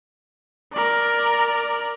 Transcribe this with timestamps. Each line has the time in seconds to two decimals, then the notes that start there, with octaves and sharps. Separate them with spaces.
0.73 A#4 D5